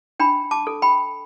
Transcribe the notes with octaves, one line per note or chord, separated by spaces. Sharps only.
D4 G5 B5
A5 D6
A4
G5 B5